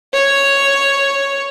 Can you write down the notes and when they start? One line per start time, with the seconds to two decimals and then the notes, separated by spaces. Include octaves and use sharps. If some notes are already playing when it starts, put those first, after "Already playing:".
0.13 C#5